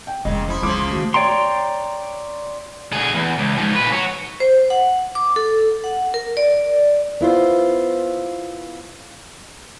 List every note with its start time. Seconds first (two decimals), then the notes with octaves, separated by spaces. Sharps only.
0.07 G5
0.25 F1 A#2 C#3 E3 D#5
0.48 F3 E4
0.62 C#2 C#3 F3 E4 C6 D6
0.91 D#3 A3 F#4
1.14 C#5 D5 G5 A#5 C6
2.93 D2 G#4
3.14 E2
3.38 C#2
3.58 G#2 F3
3.75 A#2 B4
3.92 F#4 C#5
4.40 C5
4.70 F#5
5.15 D6
5.36 A4
5.84 F#5
6.14 A#4
6.37 D5
7.21 B3 E4 F4 C5